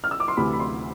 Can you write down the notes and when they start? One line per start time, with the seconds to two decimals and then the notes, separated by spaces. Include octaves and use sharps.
0.04 F6
0.11 E6
0.20 D6
0.28 C6
0.37 D2 C3 E3 B5
0.53 B5
0.60 C6